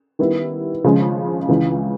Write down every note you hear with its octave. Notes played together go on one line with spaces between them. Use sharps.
D#3 G3 B3 E4
C#3 F3 G#3 C#4
C#2 C#3 E3